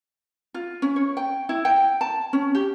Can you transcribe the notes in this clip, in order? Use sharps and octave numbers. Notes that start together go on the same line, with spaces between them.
F4
C#4
C#5
G5
E4
G5
A5
C#4
G4